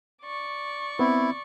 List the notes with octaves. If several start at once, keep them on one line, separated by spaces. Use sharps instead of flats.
D5 C#6
B3 C4 E4